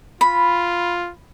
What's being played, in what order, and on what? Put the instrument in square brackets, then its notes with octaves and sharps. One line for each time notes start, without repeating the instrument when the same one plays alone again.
[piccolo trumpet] F4 [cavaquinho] B5